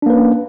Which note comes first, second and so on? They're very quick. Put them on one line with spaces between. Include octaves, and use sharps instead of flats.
D4 A#3 B4 C#4